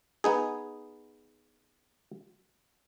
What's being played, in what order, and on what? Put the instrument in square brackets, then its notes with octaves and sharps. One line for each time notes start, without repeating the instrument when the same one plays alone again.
[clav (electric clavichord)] B3 D#4 G#4